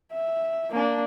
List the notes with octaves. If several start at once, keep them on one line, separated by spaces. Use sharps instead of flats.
E5
A#3 D4